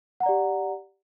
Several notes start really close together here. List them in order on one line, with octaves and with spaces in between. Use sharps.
F#5 A#5 D5 G4